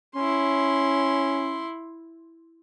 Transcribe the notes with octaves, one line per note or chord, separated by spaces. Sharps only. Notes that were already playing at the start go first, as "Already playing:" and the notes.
C#4 E4 C6